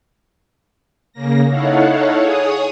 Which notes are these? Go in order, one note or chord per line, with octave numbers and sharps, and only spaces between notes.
C#3 A#3 A#6
D#4 E4 A4 C#5 F5 F#5
G#4 C#5 D#6